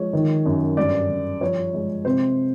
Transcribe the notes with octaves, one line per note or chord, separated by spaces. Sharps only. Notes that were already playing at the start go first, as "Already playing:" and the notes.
Already playing: F3 G#3 C#5
D#3
F#2
G2 D5
G2
F3 C#5
G#3
C3 C5